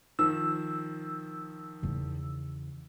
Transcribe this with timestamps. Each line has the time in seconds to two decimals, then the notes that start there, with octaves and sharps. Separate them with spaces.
0.19 D#3 F3 E6
1.83 E2 C#3